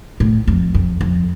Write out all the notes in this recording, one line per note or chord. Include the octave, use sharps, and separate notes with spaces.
A2
F2
F2
F2